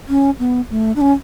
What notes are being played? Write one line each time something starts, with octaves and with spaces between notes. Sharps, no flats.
C#4
B3
A3
D4
C#4